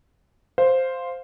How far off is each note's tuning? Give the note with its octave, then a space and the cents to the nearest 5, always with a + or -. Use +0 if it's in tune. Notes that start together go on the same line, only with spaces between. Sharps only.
C5 +0 F5 +5